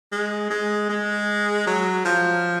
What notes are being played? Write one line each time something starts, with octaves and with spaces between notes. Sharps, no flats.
G#3
G#3
G#3
F#3
F3